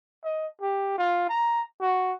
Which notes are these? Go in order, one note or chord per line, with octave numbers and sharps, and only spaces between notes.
D#5
G4
F4
A#5
F#4